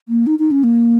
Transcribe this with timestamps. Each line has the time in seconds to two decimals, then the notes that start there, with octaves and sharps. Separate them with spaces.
0.09 A#3
0.27 D#4
0.39 D#4
0.51 C#4
0.64 A#3